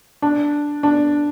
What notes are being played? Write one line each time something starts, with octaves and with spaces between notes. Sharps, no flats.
D4
D4